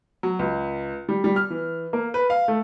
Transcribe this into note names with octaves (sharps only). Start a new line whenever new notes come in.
F#3
C#2
G3
G3
F6
E3
A#3
B4
F5
A3